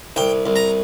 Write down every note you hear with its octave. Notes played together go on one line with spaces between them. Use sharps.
C2 G5
C2
A#5